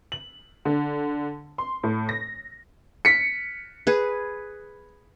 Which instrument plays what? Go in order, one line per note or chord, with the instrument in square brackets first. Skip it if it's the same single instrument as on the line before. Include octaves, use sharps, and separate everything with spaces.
[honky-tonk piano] F#7
D3
C6
A2
A#6
[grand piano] B6 C#7
[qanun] G#4 B4